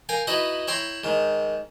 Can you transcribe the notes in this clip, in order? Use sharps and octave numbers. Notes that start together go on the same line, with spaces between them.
A#4 F5 G5 G#5
D#4 E4 F#4 B4 D#5
E4 C#5 G5 A#5 C6
G#2 D#3